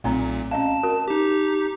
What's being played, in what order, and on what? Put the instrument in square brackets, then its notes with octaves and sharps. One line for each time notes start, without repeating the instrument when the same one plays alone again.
[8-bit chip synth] B1 A#2 [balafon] A3 C4 A#5
[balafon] C#4 D#5 F5 [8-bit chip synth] A5
[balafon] F#4 A#4
[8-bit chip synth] D#4 G4